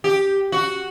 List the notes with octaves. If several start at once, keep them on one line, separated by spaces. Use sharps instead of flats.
G4
F#4